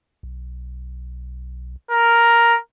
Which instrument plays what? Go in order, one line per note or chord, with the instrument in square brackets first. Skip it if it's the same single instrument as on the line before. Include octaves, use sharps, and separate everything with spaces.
[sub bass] B1
[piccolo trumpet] A#4